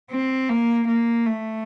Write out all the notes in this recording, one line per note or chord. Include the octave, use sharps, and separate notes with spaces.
C4
A#3
A#3
A3